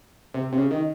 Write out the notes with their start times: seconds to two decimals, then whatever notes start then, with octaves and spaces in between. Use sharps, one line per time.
0.34 C3
0.52 C3
0.57 C#3
0.71 D#3